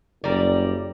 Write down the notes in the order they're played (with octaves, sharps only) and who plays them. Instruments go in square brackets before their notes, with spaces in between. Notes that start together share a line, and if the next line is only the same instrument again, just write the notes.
[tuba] F#1 [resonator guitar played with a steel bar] G3 A#4 D5